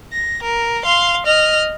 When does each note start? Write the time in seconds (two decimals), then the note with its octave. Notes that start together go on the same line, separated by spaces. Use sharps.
0.12 A#6
0.43 A#4
0.84 F5 C6
1.26 D#5 F6